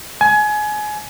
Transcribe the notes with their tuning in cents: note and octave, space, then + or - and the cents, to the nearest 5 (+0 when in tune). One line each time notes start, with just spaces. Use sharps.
G#5 +25